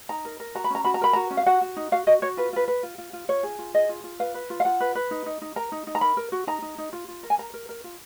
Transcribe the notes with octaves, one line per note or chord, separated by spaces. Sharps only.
D#4 A#5
A#4
A#4
F#4 A#5
B5
C#4 A#5
F#4 B5
A#5
A#4 B5
F#4 A#5
C#4
F5
F#4 F#5
F#4
D#4
F#4 F5
F#4 D#5
F#4 C#5
F4 B4
F4 B4
B4
F4
F4
F4
F4 C#5
G#4
F4
G#4 D#5
F4
F4
B4 F5
B4
F4
F5
F4 F#5
B4
B4
D#4
D#4
D#4
A#4 A#5
D#4
D#4
A#5
A#4 B5
A#4
F#4
D#4 A#5
D#4
D#4
F4
F4
A#4
G#5
A#4 A#5
A#4
A#4
F4